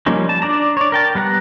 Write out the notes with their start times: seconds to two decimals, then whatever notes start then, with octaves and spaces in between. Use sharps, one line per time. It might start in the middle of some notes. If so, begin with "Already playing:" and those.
0.06 F3 G3 A#3 C#4 D#4
0.29 A5
0.42 D4 D5 A#5
0.77 C#5 D5
0.92 A#4 G5 A5
1.15 G3 B3 F#5 A#5 F#6